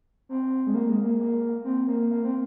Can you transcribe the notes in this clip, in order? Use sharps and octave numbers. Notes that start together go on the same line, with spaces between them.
C4
G#3
A#3
G#3
A#3
A#3
C4
A#3
A#3
C4